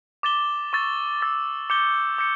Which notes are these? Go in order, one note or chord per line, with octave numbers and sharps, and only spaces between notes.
D6 A6 E7 G7
C#6 E6 A6
C#6 E6 A6
D6 G6 C#7 G7
D6 G6 C#7